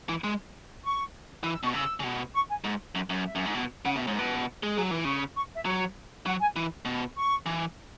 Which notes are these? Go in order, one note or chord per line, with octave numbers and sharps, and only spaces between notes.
E3
G#3
C#6
E3 E6
E6
B2 C#6
C#3 E6
C#3
B2
C#6
G#5
G#2
F#2
F#2
E5
F#2
G#2
B2
C#3 F#5
B2 E5
G#2 C#5
B2 B4
G#3
G#4
F#3
E3 B4
C#3 C#6
C#6
E5
F#3 C#5
F#3 F#5
G#5
E3
B2
C#6
E3